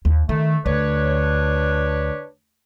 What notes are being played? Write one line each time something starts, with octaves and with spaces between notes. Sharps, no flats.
D#2
D#3 A3
D2 D4 B4 C#5